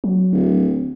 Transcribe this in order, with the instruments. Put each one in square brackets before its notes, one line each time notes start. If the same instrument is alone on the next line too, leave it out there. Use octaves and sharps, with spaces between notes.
[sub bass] F#3
[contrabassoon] D1